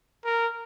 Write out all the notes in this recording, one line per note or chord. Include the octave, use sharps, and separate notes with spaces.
A#4